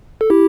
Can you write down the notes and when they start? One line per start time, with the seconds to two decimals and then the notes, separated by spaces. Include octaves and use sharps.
0.21 A4
0.30 E4 G4